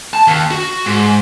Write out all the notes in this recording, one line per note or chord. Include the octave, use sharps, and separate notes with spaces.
A5
D#2
F#4
G#2